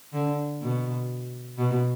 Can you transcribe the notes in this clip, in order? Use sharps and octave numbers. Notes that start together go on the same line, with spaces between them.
D3
B2
B2